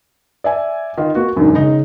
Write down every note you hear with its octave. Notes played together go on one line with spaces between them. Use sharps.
D5 E5 G#5
D#3 F4
A#3 F#4
E1 F#2 D3 D#4
C#3 D#4